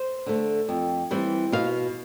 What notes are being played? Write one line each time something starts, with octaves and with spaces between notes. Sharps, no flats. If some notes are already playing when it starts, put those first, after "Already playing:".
Already playing: C5
D3 A3
F2
E3 G3 C4
B2 F5